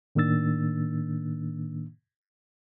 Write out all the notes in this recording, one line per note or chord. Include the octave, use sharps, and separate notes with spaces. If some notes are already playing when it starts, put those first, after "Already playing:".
A2 D#3 A#3 D4 E6 A6